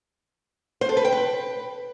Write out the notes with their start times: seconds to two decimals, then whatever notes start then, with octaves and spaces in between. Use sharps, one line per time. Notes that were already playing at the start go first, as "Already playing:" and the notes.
0.81 C5
0.89 A4
0.97 B4
1.05 G5
1.12 B4